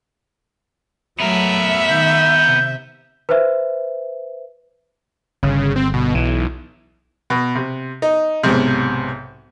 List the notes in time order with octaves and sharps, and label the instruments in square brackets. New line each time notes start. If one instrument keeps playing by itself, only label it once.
[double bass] F#3 A3 [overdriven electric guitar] B3 A#4 [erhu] E5
[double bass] D#3 [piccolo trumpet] G6
[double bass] C3
[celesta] B4 C5 E5
[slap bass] G1 [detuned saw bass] C#3
[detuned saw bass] C4
B2
[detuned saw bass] B1 [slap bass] E3
[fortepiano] B2
C3
D#4
B1 G#2 C3